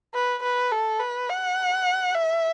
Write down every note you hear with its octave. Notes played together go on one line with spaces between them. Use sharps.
B4
B4
A4
B4
F#5
E5